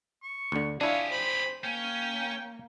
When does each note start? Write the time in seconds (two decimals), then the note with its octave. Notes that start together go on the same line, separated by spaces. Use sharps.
0.23 C#6
0.52 D2 D3
0.81 D4 E4 F4 G4 G#4 C#5 F5
1.11 C5 B5
1.64 A#3 C#4 G5